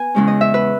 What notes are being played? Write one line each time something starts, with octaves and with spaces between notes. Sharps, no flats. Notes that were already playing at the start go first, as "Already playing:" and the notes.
Already playing: B3 B4 G#5
E2 C#3 G#3 C#4
D#5
E5
B4